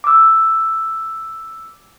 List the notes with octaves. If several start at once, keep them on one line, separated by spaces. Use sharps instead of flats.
D6 E6